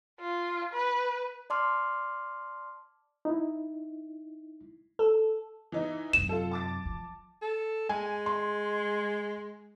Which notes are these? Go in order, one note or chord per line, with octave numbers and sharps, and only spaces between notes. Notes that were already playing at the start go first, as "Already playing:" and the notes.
F4
B4
D5 A5 C6 D6 F6
D#4 E4
A4
E3 D#4
F#2 C3 E7
F4 A4
A5 D6 A6
F3
A4
G#3 G#5
C6